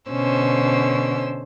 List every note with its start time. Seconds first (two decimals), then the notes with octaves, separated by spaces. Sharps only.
0.10 B2 D3 C#4 C5 E6